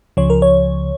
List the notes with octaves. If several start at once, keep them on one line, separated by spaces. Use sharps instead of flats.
C#2 C#3 F3 C#5
A#4
C#5